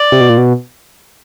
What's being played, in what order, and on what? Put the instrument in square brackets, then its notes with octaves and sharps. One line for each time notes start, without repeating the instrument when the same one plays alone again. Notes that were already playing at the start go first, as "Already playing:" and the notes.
Already playing: [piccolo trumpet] D5
[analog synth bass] C3
B2
A#2
B2